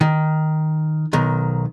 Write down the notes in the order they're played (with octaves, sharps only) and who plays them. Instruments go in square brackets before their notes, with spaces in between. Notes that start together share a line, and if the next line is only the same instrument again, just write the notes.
[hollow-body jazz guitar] D#3
B1 D#3